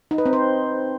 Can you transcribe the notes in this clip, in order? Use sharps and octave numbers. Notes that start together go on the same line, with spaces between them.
D#4
B4
C4
C5